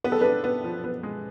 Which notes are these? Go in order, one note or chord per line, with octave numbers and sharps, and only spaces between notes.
B3 B4
A4
D4 B4
B3
F3
B3
G#3